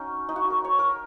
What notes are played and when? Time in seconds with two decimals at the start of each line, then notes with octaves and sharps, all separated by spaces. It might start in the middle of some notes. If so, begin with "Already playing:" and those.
Already playing: C#4 D#4 F#4
0.29 D#4
0.36 F#4
0.50 A#4
0.65 C#5
0.79 A#4